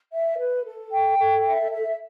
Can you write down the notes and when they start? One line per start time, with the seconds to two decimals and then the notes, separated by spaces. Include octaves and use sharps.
0.12 E5
0.38 B4
0.65 A4
0.91 G5
1.18 A4
1.44 E5
1.70 E5